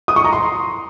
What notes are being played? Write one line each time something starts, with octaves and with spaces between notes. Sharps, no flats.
D#6
C#6
A#5
C6